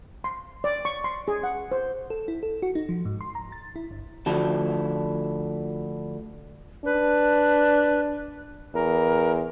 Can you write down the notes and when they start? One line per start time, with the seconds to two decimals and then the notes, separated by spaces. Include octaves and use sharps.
0.24 C6
0.64 D5
0.85 C#6
1.04 C6
1.28 G#4
1.43 F#5
1.71 C5
2.10 A4
2.28 E4
2.43 A4
2.62 F#4
2.75 D#4
2.89 F3
3.05 G#2
3.21 C6
3.35 A#5
3.52 A6
3.76 E4
3.91 G1
4.26 D2 D3 F3 E4 F#4 A5
6.85 D4 B4
8.74 E2 A#4